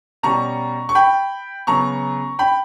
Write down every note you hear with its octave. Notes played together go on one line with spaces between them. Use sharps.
B2 G3 C#4 A#5 C#6
C#6
G5 B5
C#3 F#3 B3 A#5 C#6
G5 B5